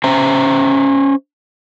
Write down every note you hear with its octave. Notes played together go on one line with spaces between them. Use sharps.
C#4 C5 E5 A#5